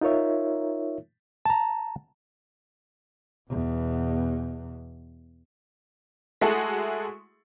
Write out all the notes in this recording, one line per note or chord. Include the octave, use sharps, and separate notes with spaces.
D#4 F4 A#4 C#5 E5
A5 A#5
E2 B2
G#3 A3 E4 F#4 G#4 A4